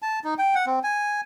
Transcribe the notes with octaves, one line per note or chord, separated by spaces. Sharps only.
A5
D#4
G5
F#5
C4
G#5